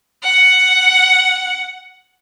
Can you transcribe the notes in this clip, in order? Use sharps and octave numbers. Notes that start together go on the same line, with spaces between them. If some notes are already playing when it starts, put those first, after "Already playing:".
F#5